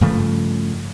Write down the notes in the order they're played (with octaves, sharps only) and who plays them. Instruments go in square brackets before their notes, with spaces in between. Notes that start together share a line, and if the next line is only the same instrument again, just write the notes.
[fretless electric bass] G2 C#3 F3 A3